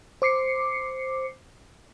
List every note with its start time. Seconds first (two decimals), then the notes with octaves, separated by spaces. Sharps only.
0.22 C5 D6 C7 C#7